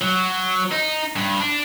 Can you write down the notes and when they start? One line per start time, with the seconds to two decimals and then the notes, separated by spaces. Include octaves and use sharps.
0.01 F#3
0.72 D#4
1.16 G2
1.40 D4